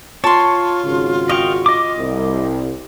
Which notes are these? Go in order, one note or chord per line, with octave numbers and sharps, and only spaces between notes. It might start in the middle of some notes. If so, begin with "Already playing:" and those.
F4 C#5 A5 C6
G#1 C#3 F#4
D#5 F5 G5 C#6
D#5 D6
C2